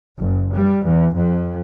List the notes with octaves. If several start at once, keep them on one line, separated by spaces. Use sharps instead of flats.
F#1
G3
E2
F2